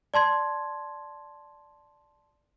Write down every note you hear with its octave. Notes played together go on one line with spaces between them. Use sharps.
D5 A5 C6 G#6